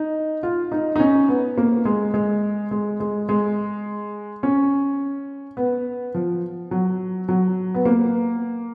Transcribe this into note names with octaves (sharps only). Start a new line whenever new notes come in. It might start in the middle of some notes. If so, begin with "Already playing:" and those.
Already playing: D#4
F4
D#4
D#4
C#4
B3
A#3
G#3
G#3
G#3
G#3
G#3
C#4
B3
F3
F#3
F#3
B3
A#3